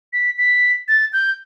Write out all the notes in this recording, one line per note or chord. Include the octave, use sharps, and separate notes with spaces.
B6
B6
A6
G6